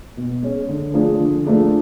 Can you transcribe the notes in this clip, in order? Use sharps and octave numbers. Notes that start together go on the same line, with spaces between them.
B2
G#3 C#4 G#4
D3
F3 A3 D4 G#4
D3
F3 A3 D4 G#4